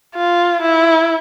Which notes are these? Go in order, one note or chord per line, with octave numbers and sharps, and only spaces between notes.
F4
E4